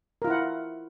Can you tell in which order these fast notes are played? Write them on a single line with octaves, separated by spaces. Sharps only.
A#4 F4 E4 F#5